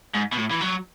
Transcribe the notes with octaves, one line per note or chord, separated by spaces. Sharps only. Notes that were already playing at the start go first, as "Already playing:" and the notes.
G#2
B2
A2
E3
F#3